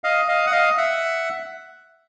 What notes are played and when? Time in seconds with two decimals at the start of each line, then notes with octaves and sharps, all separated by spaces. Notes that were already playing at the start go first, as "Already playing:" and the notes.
0.04 D#5 F5
0.28 D#5 F5
0.46 F#5
0.52 D#5 F5
0.77 E5 F#5